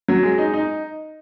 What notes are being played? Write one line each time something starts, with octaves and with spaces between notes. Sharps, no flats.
F#3
G#3
D#4
D#4